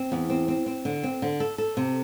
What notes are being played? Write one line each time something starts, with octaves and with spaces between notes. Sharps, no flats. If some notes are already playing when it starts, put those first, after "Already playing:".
Already playing: C4
E2
C4
C4
C4
D3
C4
D3
A4
A4
C3